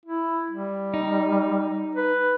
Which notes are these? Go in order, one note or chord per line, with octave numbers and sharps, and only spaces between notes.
E4
G3
D#4
B4